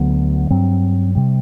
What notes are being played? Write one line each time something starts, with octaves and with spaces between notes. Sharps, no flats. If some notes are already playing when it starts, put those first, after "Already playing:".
Already playing: D2 D3 F#3 B3
G2 F#3 C4
C3 G3